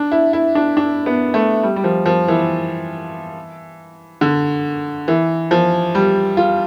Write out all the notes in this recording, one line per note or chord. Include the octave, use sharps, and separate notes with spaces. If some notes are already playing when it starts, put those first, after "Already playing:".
Already playing: D4
E4
E4
D4
D4
B3
A3
G3
G3
F3
F3
E3
D3
E3
F3
G3
F4